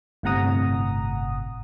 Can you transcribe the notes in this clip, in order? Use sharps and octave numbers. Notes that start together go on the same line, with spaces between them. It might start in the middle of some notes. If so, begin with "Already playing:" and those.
G1 A2 C3 F#5 A#5 D#6